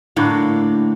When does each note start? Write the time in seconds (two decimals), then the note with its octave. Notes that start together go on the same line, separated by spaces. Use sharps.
0.16 A2 D3 A#3